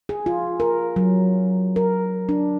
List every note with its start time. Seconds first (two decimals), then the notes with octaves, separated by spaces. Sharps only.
0.09 G#4
0.26 F4
0.60 A#4
0.96 F#3
1.76 A#4
2.29 D4